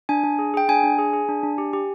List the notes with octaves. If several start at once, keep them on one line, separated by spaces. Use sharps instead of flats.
D4 G#5
D4
G#4
G#4 G5
D4 G#5
D4
G#4
G#4
D4
D4
G4
G4